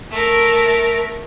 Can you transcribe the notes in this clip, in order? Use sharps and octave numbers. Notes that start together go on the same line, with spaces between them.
A3 A#4